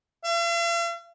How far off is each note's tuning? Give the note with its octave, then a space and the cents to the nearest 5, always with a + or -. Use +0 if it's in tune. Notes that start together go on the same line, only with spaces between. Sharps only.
F5 -45